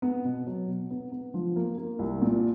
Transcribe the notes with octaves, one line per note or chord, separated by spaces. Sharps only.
B3
B2
F#3
B2
B3
B3
F3
A#3
A#3
C2
A#2